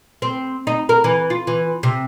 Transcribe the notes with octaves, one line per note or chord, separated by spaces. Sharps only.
C4
D#4
A#4
E3
F4
E3
C3